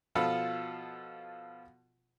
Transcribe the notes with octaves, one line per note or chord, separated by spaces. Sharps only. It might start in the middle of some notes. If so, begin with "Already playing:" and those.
B2 F3 F4 A4 B5